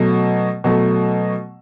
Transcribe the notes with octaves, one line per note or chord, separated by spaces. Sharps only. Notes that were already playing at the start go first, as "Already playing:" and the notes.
Already playing: B2 F#3 A3
B2 F#3 A3